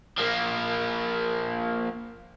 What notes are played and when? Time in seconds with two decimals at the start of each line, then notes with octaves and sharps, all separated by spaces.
0.18 F3 A#3